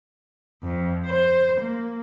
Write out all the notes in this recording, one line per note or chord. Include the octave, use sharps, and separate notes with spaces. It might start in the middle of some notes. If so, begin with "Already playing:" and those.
F2
C5
A#3